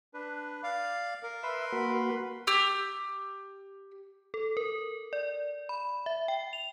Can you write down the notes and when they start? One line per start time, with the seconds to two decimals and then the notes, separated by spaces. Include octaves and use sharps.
0.14 D4 B4
0.64 D5 F5
1.23 A#4
1.43 B4 E5 B5 C6
1.73 A#3 F#4
2.47 G4 E6
4.34 A4
4.57 A#4
5.13 D5
5.69 B5
6.06 E5
6.28 G5
6.53 F7